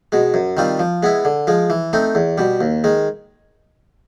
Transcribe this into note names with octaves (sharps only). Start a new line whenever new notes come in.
B2 G#3
F#2
D#3 G3 C4 F4
F3
G#3 B3 E4
D3
F3 G#3
E3
A3 C4 D#4
E2
B2 G3
D#2
D#3 G#3